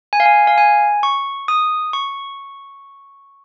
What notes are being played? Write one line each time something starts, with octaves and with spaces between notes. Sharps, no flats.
G#5
F5
G#5
F5
G#5
C#6
D#6
C#6